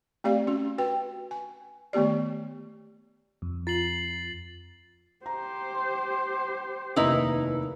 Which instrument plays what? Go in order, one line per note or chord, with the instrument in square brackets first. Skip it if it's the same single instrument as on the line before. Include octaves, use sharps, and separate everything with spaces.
[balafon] A3 C4 G4 D5 F5
C#4 F#4
F#4 B4 G5
G#5
D#3 A3 B3 G4 D5
[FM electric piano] F2
[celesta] F4 [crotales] A6 C7 F#7
[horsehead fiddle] G4 C5 [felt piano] A#5
[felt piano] F1 D#2 B4 [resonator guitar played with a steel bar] D#4 E4